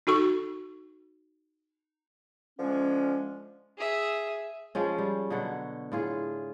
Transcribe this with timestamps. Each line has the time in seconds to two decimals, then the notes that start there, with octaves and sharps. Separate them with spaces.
0.07 D#4 F#4 A4 C#6
2.59 D3 F3 G#3 C#4
3.78 G#4 E5
4.75 F3 G#3 C#4
4.98 G3
5.30 B2 D3 F#3 F#5
5.92 A2 F4 G#4